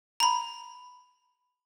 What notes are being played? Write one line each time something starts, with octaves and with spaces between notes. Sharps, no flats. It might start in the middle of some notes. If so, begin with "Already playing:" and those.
A#5 B5